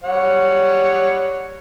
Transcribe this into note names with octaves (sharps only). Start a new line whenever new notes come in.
G3 C#5 F#5